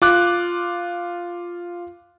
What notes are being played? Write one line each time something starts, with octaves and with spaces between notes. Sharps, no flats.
F4 D6 F#6